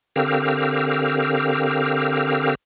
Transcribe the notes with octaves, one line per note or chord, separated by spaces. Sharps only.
D3 C4 G4 A#4 F5 E6